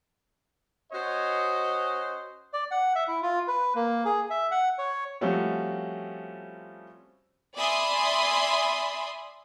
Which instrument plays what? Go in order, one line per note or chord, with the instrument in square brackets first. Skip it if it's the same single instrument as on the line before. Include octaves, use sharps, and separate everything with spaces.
[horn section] C#4 F#4 C5 C#5 D#5
[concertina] D5
F#5
E5
E4
F4
B4
A#3
G#4
E5
F#5
C#5
[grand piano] F3 G3 A3 C4 C#4 F#4
[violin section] D5 E5 G#5 B5 C6 D#6